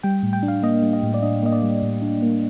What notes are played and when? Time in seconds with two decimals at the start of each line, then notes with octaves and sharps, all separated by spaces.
0.03 G3 G5
0.23 A2
0.33 G5
0.43 D4
0.48 F5
0.63 A#3 D#5
0.82 G3
0.93 D#5
1.03 A2
1.14 D5
1.22 D4 D#5
1.43 A#3 D#5
1.52 D5
1.63 G3
1.82 A2
2.02 D4
2.22 A#3